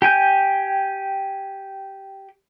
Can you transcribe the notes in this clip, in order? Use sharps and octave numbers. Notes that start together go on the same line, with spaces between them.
G4 G5 G#5 G6